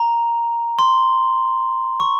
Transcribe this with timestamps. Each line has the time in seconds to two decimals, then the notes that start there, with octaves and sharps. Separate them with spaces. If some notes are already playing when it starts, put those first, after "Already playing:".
Already playing: A#5
0.79 C6
2.00 C#6